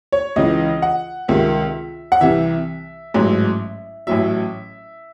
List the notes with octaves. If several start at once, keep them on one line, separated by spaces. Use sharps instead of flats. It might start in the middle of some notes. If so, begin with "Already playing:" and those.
C#5
C#2 C#3 E3 D#5
F#5
C#2 C3 D#3 E5
F#5
C2 C3 E3 E5
A1 G#2 F#3
A1 A2 F#3 E5